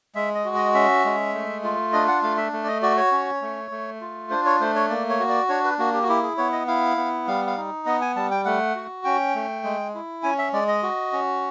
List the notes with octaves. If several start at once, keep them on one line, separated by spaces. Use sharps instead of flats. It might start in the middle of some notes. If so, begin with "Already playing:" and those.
G#3 E5
D#5
F#4
D#5
C#4 E5
G#3
A3
F4
D4 D#5
F#5
A3 F5
E5
A3
D5
D#5
F#4 D5
C#5
C#4
A3
A3
F4
D4 C5
C#5
A3 C5
C#5
A#3 D5
C#5
F#4
D5
D4 C#5
B4
A#3 F#4
G4
F#4
E4 G4
G#4
B3 C#5
D#5
E4 F5
B3
G3 F5
F5
D#4
B3 D#5
G#5
G3 A5
G5
A3 F#5
F#4
C#4 G5
A3
G#3
E4
C#4 G#5
E5
G#3 D5
D#5
F#4
C#4